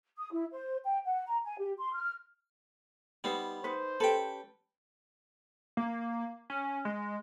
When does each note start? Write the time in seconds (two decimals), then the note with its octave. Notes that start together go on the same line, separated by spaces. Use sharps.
0.17 D#6
0.32 E4
0.52 C5
0.84 G5
1.06 F#5
1.27 A#5
1.45 G#5
1.58 G4
1.78 C6
1.94 F6
3.24 G3 B3 D#4 C5
3.64 D#4 B4 C5
4.00 C#4 G4 A4 B4 G5
5.77 A#3
6.50 C#4
6.85 G#3